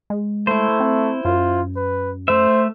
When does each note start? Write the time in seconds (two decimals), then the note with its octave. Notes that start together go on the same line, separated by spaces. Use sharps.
0.10 G#3
0.47 A3 E4 C5
0.80 C4
1.25 F#2 F4
1.76 B4
2.28 A3 C5 E5